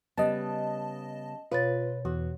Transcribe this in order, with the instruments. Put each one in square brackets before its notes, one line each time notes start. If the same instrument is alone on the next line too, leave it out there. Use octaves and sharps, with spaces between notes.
[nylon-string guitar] C#3 G3 B3 [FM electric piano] D#5 A5
[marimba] B2 C#5 A6 [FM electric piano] F4 [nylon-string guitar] B4
[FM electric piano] E2 [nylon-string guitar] F#4